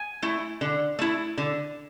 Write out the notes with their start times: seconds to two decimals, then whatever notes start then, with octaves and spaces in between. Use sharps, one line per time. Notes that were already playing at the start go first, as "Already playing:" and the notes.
Already playing: G#5
0.22 A3 E4
0.61 D3
0.99 A3 E4
1.38 D3